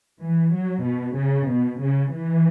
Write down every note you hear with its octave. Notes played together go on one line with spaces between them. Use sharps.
E3
F#3
B2
C#3
B2
C#3
E3